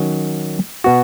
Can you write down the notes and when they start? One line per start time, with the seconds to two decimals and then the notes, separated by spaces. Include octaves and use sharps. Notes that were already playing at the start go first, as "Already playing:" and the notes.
Already playing: D#3 F#3 C#4
0.84 B2 B3 F#4